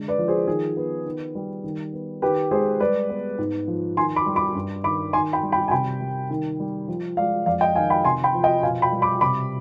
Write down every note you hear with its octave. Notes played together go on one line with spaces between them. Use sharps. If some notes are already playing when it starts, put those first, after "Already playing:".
Already playing: D3 G#3
B4 D5
F3
G#4 C5
D#3 G#4
B3
D#3
G3
D#3
B3
D#3 G4 B4
G#3 G#4 C5
G3 B4 D5
B3
G#2
F3
D#3 G#5 C6
B5 D6
G3
B5 D6
G2
D#3 B5 D6
D#3 G#5 C6
G5 B5
G3
G5 B5
G#5
C3 G5 B5
G3
D#3
G3
F3
G#3 D5 F5
F2 D5 F5
D#5 G5
D#3 F5 G#5
G5 B5
C3 G#5 C6
G5 B5
F3
D#5 G5
B2 F5 G#5
G5 B5
G3
B5 D6
C3 B5 D6